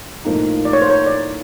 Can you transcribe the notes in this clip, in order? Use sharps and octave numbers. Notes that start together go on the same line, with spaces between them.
A2 F3 A#3 D#4
D5
C#5
C5
C#5
D5